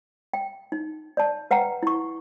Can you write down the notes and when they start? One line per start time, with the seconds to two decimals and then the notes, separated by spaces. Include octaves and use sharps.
0.34 G5
0.72 D#4
1.17 D5 A5
1.51 B4 F#5 G5 A#5
1.83 E4 C#6